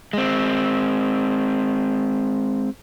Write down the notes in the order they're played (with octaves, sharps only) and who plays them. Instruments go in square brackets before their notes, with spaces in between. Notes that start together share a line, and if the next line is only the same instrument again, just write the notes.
[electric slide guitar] G#3 C4